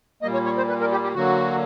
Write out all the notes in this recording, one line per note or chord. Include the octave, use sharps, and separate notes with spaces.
A#2 G3 A#3 D#5
C#5
C#5
C5
B4
A#4
G4
G4
D3 F#3 A#3 F#4